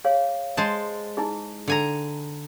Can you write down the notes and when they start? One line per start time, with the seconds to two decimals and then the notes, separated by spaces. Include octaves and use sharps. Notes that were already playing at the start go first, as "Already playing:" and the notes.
0.05 G#4 C#5 F5
0.57 G#3 C5 A5
1.17 D#4 E4 G#4
1.68 D3 G#5 A#5